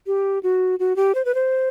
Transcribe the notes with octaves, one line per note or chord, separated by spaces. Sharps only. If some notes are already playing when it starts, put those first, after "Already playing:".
G4
F#4
F#4
G4
C5
B4
C5